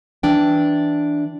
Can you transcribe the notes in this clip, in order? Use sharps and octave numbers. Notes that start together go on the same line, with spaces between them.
E3 D4 G5